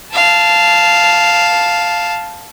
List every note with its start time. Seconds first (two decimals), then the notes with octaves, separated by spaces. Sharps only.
0.13 F5 A5